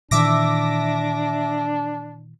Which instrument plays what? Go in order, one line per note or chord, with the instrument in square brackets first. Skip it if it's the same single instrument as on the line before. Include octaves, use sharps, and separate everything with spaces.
[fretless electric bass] A#2 D#3 E3 [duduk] D4 [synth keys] E5 D6 A#6